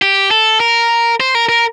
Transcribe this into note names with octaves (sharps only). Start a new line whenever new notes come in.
G4
A4
A#4
C5
A#4
A#4